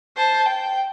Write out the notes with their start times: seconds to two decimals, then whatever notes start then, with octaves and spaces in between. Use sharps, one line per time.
0.17 C5 A5
0.46 G5